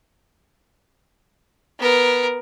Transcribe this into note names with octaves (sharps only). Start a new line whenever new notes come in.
B3 A#4